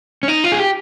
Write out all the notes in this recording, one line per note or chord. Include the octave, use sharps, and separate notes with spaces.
C#4
D#4
F4
G#4
G4